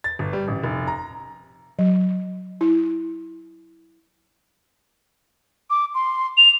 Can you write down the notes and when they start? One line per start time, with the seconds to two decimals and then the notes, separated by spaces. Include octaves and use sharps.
0.04 A6
0.19 G1
0.33 G3
0.48 A1
0.64 F1
0.87 A#5
1.79 F#3
2.61 E4
5.70 D6
5.95 C6
6.37 F7